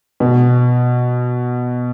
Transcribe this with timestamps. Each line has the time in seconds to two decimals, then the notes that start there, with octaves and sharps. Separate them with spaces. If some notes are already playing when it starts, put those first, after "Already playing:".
0.20 B2